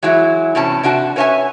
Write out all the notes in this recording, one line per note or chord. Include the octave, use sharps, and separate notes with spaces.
E3 F#3 G#3 E4 F#4
E2 A2 C3 C#4 A5
C3 D4 F#4 A5
C#4 B4 C#5 D#5 E5 G#5